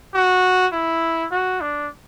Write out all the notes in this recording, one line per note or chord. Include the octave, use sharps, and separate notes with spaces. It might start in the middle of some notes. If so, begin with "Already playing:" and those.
F#4
E4
F#4
D4